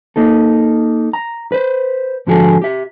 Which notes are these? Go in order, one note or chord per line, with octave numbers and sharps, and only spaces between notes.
A#3 D#4 A4
A#5
B4 C5
G#2 D3 F3 F#4 G#4 A4
G4 E5